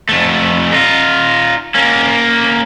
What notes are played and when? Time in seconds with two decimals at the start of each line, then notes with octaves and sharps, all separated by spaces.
0.09 F2 A3
0.72 D#4 F4
1.75 A#3 C#4